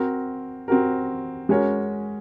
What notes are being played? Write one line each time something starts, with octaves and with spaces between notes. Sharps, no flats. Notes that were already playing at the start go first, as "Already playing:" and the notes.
Already playing: C4 F#4 A#4
C4 F#4 A#4
G#3 C#4 F#4 A#4 C#5